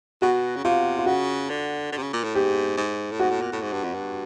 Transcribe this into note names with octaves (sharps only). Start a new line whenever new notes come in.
B2 F#4
C#3
C3 F4
F4
C#3 F#4
D3
D3
C3
C#3
A#2
A2
G#2 G4
G#2
A2
G#2 F#4
A2
A#2
A2
G#2
G2
F2
G2